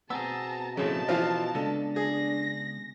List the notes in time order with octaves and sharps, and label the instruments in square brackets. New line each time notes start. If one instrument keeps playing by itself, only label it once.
[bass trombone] B2 [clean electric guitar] B3 C4 G#4 [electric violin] A5 A#5 [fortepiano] E6
[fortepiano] A2 C#3 [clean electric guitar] F3 C4 A#4 [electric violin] D#5 A5
[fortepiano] E3 F3 F4 [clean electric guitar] A#4 F5
[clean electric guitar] C#3 G#3 B3 [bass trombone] D4 [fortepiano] A4
[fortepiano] G#4 [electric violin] A#6